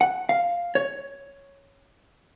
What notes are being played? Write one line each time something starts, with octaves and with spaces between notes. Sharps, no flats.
F#5
F5
C#5